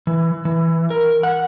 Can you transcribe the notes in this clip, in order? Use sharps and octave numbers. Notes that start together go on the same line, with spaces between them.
E3
E3
A#4
F#5